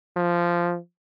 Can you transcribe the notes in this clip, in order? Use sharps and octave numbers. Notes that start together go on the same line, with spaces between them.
F3